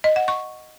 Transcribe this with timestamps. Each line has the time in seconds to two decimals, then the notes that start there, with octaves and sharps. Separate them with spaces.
0.04 D#5
0.16 F#5
0.28 C#6